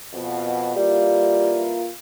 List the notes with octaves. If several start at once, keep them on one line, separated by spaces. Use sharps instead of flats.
F2 B2
E3 G3 A#3 F4